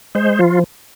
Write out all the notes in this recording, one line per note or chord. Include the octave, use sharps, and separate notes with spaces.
G#3 C5
F3 F4